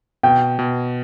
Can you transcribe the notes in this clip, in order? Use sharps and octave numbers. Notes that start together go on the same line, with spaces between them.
B2 G5
B2